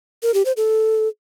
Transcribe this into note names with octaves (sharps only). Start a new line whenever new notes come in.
A#4
G4
C5
A4